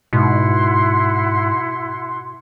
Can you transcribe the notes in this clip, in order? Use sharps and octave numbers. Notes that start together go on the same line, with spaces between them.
G#2 B2 E4 F#5 C6